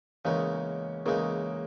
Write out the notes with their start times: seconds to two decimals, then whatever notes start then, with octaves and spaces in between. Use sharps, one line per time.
0.25 E2 C#3 G#3 A#3 C#4 D#4
1.05 E2 C#3 G#3 A#3 C#4 D#4